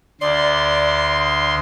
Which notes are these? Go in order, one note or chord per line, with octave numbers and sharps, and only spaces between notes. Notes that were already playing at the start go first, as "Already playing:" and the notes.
D2 D5 C6